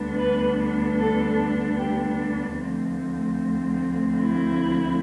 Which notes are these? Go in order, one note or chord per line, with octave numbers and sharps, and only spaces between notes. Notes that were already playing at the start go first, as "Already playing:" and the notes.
Already playing: D2 D3 G3 B3 D4
B4
A4
G4
D2 D3 F3 A3 C4
E4